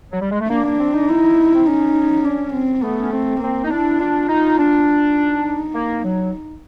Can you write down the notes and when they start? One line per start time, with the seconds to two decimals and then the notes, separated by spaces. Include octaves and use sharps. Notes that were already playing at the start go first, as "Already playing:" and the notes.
0.12 F#3
0.22 G3
0.31 G#3
0.41 A3
0.50 A#3 D4
0.65 A#3
0.79 C4
0.94 D#4
1.09 E4
1.55 C4
1.66 C#4 D#4
2.25 D4
2.54 C4
2.83 A3 B3
3.01 C#4
3.12 C4
3.41 A#3 C4
3.64 D#4
3.70 D4 E4
4.00 D4 F4
4.29 D#4
4.58 D4
5.16 D#4
5.75 A#3
6.04 F#3